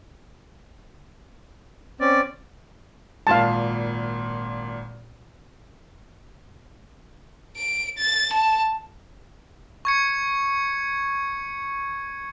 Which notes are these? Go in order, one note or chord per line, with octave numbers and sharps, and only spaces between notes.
C4 C#4 D5
G#1 A#2 F5 A5
D7
A6
A5
C#6 G#6 C#7